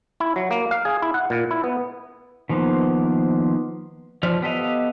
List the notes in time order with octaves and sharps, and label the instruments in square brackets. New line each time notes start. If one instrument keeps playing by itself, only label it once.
[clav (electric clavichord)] E4
F#3
A#3
F5
G#4
E4
F#5
A#2
E4
B3
[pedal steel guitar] D#3 F3 A#3 B3 C5
F3 C5 D5 F6
B3 G4 A4 D#5 F5